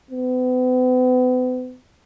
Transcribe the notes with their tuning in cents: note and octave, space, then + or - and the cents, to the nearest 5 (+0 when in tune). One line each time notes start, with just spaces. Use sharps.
B3 +40